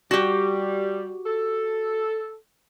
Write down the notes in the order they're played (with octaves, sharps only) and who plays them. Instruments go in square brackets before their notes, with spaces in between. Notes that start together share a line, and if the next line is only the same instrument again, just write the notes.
[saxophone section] G3 [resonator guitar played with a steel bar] F#4 G4
[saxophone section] A4